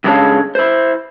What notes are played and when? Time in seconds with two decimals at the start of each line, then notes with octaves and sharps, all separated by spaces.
0.04 G2 C#3 G#3 A4 C#5 F5
0.55 E4 C5